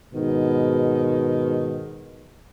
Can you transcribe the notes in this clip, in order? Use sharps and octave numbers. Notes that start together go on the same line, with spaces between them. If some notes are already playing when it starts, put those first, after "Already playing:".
G#2 B2 D#3